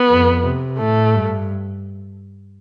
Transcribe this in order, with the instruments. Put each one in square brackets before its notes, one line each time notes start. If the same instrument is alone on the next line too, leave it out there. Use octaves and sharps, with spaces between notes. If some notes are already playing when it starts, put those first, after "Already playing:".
Already playing: [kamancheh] B3
[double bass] F2
C3
[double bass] A2 [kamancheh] A3
[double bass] G2